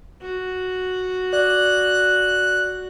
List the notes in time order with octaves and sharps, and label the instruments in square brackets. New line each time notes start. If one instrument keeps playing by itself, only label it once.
[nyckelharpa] F#4
[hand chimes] D5 [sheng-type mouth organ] F#6